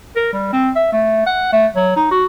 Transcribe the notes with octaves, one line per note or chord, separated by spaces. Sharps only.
A#4
G3
C4
E5
A3
F#5
A3
F#3
D#4
F#4